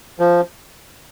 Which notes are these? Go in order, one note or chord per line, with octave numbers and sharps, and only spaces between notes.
F3